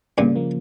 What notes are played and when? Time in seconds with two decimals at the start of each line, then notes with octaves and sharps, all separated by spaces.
0.18 G2 A#2 C#3
0.36 F3 A#3